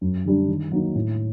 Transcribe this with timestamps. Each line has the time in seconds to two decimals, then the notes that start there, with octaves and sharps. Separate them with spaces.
0.01 F#2
0.25 D3 G3 D4
0.48 D#3
0.72 F#3 A#3 D#4
0.95 A2